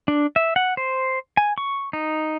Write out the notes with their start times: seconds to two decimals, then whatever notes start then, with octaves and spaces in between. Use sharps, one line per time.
0.08 D4
0.36 E5
0.56 F#5
0.77 C5
1.37 G#5
1.58 C#6
1.93 D#4